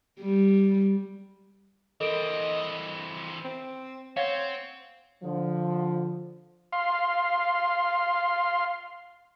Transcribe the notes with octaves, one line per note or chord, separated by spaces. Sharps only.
G3
E3 C4 A4 A#4 D#5 D7
C4
C4 C#5 F5 F#5 G#6
D3 F3
F5 C6